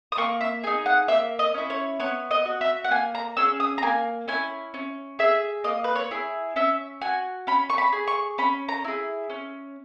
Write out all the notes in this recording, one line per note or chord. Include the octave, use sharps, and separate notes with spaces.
D#6
A#3 C#6
E5
D#4 G#4 G#5
F#5
A#3 E5
D#5
C#4 E4
C#5
B3 C#5
D#5
F#4
E5
F#5
A#3 G#5
A#5
C#4 G#4 E6
D#6
A#5
A#3 G#5
C#4 E4 G#5
C#4
G#4 E5
A#3 D#5
B4
C#5
E4 G#4
C#4 E5
F#4 G#5
C#4 B5
C#6
B5
G#4
C#6
C#4 B5
A#5
E4 G#4
C#4